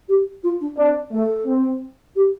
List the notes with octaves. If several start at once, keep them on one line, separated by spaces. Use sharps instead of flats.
G4
F4
D4
C4 D4
A3 A4
C4
G4